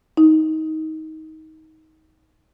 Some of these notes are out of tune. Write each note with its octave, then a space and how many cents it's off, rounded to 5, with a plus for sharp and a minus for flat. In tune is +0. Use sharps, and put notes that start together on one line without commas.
D#4 +20